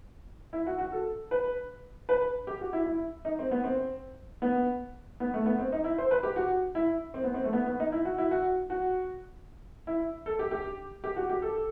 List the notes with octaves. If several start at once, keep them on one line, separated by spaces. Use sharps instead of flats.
E4
F#4
F#4
A4
B4
B4
G4
F#4
E4
E4
D#4
C4
B3
C4
B3
B3
A3
B3
C4
D#4
E4
C5
B4
G4
F#4
E4
C4
B3
C4
A3
B3
B3
D#4
E4
F#4
E4
F#4
F#4
E4
A4
G4
G4
G4
F#4
G4
A4